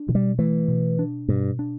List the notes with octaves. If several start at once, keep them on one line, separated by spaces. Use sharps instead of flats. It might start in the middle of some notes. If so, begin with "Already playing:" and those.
Already playing: D4
B2 E3
G3
E3 A3
B2
D4
G2 B2
D4